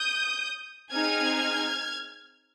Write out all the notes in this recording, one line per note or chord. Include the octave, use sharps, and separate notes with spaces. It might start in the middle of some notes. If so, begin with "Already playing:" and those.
Already playing: D#6 G6
C4 D#4 G#4 F6 G#6